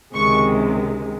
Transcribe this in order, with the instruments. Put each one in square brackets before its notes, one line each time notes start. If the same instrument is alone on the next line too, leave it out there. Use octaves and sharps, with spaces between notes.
[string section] C#2 C3 D#3 G#3 C#6